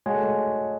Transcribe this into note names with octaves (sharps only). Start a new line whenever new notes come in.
G#3 F#4 C#5 F#5 A5
A3
G#3